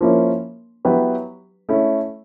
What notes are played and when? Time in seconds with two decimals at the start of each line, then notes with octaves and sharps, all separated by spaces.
0.01 F3 A#3 C#4 E4
0.85 F#3 B3 E4 G4 B4
1.69 A3 C#4 E4